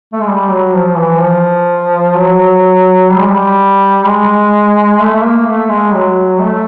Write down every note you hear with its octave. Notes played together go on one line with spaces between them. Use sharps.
A3
G#3
G3
F#3
F3
E3
F3
F#3
G3
G#3
G3
G#3
A3
A3
A#3
A3
G#3
F#3
A3